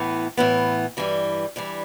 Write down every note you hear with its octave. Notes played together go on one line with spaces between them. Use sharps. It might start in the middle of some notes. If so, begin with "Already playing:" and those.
Already playing: A2 E3 B3
A2 E3 B3
G2 E3 G3
G2 E3 G3